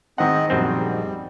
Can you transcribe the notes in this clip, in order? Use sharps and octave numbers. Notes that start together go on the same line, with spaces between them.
G#1 D#3 C4 D#5 F#5
A#1 F#2 G3 C4